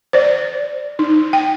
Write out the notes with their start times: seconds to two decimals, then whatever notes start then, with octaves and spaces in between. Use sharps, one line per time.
0.13 C5 D5
0.99 D#4
1.33 G5